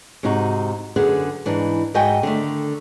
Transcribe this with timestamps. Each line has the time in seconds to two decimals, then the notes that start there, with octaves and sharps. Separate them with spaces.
0.23 G#2 C3 D#4 F#4
0.96 F#2 D3 B3 G#4 F#5
1.45 G#2 E3 D4 D#4
1.94 G#2 F#4 D#5 G5 G#5
2.23 D3 D#3 A3